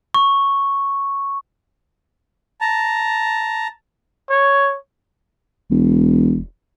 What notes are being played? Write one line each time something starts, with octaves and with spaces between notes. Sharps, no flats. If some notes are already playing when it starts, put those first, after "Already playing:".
C#6
A5 A#5
C#5
E1